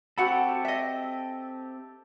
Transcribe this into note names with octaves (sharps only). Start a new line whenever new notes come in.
C4 F#4 G4 A4 F#5 B5
D#5 E5